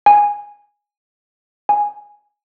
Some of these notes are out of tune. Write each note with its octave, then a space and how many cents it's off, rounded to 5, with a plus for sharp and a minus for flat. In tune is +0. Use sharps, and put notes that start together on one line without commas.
G#5 -10
G#5 -5